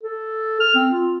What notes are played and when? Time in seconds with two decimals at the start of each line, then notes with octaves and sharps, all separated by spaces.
0.03 A4
0.60 F6
0.75 C4
0.92 F4